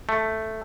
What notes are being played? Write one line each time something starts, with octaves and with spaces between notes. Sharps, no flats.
A3